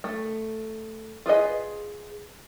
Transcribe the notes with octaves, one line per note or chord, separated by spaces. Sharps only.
A3
F4 G#4 B4 D#5